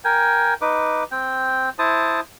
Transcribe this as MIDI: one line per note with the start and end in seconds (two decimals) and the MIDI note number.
0.05 0.54 70
0.05 0.54 79
0.05 0.54 80
0.61 1.04 63
0.61 1.04 71
0.61 1.04 86
1.11 1.70 60
1.11 1.70 79
1.79 2.20 64
1.79 2.20 72
1.79 2.20 81
1.79 2.20 87